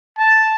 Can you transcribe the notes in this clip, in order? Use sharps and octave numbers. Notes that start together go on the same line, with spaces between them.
A5